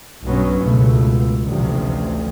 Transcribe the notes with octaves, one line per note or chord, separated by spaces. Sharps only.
B1 G2 B2 F#3 B3 C#4
C#2 B2 A3
A1 D2 C3 F3